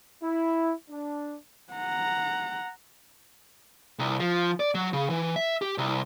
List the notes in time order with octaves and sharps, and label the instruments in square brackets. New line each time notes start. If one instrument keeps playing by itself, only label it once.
[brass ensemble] E4
D4
[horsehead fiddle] F#5 A#5
[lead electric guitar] C2
F3
D5
F#3
C#3
E3
E5
G4
C2